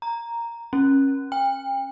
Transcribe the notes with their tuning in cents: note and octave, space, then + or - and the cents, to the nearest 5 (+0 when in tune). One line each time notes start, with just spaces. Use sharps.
A#5 +0
C#4 -25
G5 +35